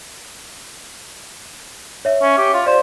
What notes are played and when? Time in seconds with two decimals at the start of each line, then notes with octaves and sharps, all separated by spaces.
2.05 C#5 E5
2.22 C#4
2.38 G4
2.54 F4
2.67 C5 D5